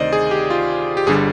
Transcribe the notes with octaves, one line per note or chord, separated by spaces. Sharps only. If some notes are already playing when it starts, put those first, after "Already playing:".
Already playing: D2 C3 D#3 C5 D5 D#5
G#4
G4
F4
G4
G1 D3 G3 G#4